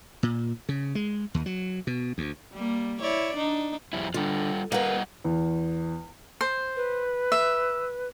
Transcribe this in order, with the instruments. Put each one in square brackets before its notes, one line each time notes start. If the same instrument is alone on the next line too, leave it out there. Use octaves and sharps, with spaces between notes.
[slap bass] A#2
C#3
G#3
D#2
F#3
B2
D2
[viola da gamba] G3 A#3
E4 C#5 D5
D4 D#4
[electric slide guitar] F2 G3 E4
[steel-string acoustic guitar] D3 [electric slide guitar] G3 F4
[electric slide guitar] G3 D#5 F#5 [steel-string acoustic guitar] A#3 B4
[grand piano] E2
[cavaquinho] C5
[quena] B4
[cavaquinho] E5